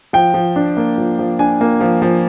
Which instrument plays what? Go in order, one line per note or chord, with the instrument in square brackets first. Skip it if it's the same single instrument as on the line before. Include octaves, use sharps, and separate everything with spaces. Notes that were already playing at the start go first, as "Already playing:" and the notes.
[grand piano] F3 G5
F3
D4
A#3
F3
F3
D4 G#5
A#3
F3
F3